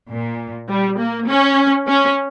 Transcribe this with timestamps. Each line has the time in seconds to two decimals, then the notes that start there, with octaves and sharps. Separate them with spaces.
0.10 A#2
0.69 G3
0.99 A#3
1.28 C#4
1.87 C#4